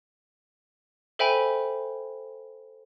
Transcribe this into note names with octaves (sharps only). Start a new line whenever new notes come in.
A4 C5 E5 G5 G#5 B5